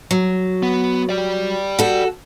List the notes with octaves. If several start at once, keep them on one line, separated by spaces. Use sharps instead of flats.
F#3
B3
G4 D5
F#4 A4